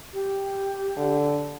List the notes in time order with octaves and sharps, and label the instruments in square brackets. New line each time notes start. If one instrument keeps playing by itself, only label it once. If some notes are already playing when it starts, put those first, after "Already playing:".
[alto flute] G4
[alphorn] D3